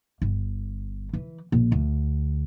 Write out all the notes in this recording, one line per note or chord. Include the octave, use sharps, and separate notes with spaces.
G1
E3
A#1
D2